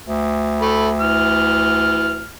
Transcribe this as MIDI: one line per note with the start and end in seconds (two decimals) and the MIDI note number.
0.08 2.34 38
0.62 0.88 57
0.62 0.88 83
1.01 2.30 52
1.01 2.30 89